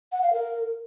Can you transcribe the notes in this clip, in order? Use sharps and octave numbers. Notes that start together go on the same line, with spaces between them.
F#5
F5
A#4